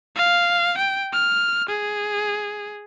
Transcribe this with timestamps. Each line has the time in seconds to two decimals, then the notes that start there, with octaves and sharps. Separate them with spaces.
0.16 F5
0.78 G5
1.13 F6
1.69 G#4